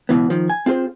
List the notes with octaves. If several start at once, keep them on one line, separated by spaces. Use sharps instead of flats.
C#2 B2 E3 B3
D#3 F3
G#5
C4 F4 G#4 C5